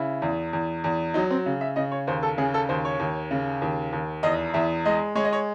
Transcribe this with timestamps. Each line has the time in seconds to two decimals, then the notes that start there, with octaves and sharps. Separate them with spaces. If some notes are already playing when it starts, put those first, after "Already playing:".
Already playing: C#3 E4
0.22 E2
0.53 E2
0.84 E2
1.14 F#3 D#4
1.30 C4
1.46 C#3
1.61 E5
1.76 C#3 D#5
1.92 C#5
2.07 D#2 C5
2.23 A4
2.38 C#3 G#4
2.54 A4
2.69 D#2 C5
2.85 C#5
2.99 D#2
3.31 C#3
3.62 D#2
3.92 D#2
4.23 E2 D#5
4.54 E2 E5
4.85 G#3 D#5
5.15 G#3 C#5
5.25 D#5
5.33 C#5